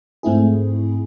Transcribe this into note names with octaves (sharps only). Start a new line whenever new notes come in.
G#2 A3 C4 E4 G#4